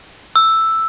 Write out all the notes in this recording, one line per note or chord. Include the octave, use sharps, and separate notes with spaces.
E6